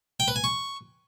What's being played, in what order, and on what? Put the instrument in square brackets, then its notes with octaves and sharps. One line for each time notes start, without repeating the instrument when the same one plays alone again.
[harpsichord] G5
B4
G#5
C#6